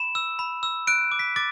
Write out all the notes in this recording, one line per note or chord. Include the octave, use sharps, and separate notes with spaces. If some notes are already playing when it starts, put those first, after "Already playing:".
Already playing: B5 E7
E6
B5
E6
F#6 D7
D6
B6
D6 A6